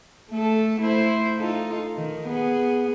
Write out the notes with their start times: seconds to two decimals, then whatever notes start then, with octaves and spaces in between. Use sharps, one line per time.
0.31 A3 A4
0.79 A3 E4 C5
1.38 D#4 F4 A4
1.96 D#3
2.27 B3 G#4